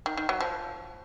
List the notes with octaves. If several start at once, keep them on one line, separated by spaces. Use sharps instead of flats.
D#3
D#3
F#3
F3